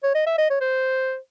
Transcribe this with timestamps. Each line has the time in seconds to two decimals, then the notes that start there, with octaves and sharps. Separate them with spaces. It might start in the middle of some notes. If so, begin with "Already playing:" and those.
0.03 C#5
0.15 D#5
0.26 E5
0.38 D#5
0.50 C#5
0.61 C5